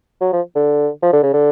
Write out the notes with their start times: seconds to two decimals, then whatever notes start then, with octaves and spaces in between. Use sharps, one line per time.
0.21 F#3
0.33 F3
0.55 D3
1.03 F3
1.13 D3
1.23 C#3
1.33 D3